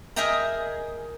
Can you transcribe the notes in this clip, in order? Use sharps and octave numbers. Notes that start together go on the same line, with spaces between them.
G#4 A#4 D#5 E5 G5 A#5